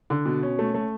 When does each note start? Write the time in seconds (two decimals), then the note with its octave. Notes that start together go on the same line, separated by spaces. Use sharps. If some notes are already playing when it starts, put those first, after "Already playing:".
0.10 D3
0.26 B2
0.43 C#4
0.59 A3
0.74 A3